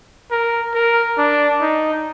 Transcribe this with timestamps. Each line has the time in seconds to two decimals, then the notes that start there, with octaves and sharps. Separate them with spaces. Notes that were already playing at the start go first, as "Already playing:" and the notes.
0.31 A#4
0.74 A#4
1.18 D4
1.61 D#4